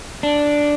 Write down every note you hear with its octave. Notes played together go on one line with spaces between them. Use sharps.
D4